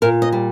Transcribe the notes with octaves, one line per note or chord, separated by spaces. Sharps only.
A#2 A#4
D#5
G3